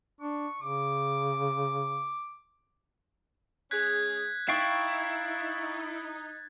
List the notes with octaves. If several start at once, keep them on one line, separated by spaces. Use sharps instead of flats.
D4 C#6
C#3 D6
G#3 C#4 G#4 F#6 G#6 B6
D#4 E4 F5 G5 C#6 A6